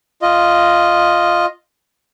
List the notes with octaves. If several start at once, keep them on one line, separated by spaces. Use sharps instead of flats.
F4 D#5